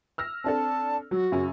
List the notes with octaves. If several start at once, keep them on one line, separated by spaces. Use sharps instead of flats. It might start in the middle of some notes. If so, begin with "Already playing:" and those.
E6 F6 A#6
C4 D4 A4 A5
F#3 F#4
F#2 C#3 C#4